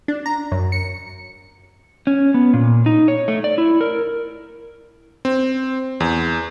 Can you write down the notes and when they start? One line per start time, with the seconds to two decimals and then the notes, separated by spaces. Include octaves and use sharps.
0.08 D4
0.26 A#5
0.52 F#2
0.72 C#7
2.07 C#4
2.34 B3
2.54 A#2
2.86 D#4
3.08 C#5
3.28 A3
3.44 D5
3.58 E4
3.81 A#4
5.25 C4
6.00 E2